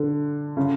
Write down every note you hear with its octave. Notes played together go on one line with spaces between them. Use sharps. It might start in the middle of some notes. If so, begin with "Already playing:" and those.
Already playing: D3
C#3